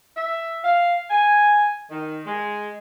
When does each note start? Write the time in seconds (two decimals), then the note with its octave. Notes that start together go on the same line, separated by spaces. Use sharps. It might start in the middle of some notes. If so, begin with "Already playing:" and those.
0.17 E5
0.63 F5
1.09 G#5
1.90 D#3
2.26 G#3